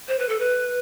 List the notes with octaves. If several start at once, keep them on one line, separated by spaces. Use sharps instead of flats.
C5
B4
A4
B4